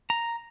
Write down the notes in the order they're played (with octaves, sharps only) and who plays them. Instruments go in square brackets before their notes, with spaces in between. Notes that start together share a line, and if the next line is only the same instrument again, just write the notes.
[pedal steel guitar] A#5